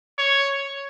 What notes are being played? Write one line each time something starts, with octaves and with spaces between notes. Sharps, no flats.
C#5